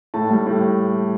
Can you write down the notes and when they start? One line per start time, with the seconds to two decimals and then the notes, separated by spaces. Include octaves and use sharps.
0.14 A2 A5
0.31 G3
0.46 A2